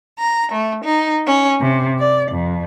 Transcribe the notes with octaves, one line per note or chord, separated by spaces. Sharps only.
A#5
A3
D#4
C#4
C3
D5
F2